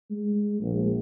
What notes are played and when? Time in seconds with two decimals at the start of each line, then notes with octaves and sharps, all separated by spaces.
0.10 G#3
0.61 A#1